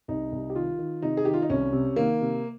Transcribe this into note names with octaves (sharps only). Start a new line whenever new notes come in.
C2 D#4
C2
G4
D#3 F4
D#3
C3 D#4
G#4
D#3 G4
F4
D#4
C2 C#4
C3
D#3 A#3
C3